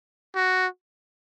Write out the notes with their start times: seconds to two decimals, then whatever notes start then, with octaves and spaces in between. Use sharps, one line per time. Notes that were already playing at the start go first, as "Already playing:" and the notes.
0.35 F#4